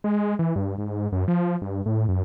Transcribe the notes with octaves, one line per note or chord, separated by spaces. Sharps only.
G#3
E3
G2
G#2
F#2
F3
G2
A2
F#2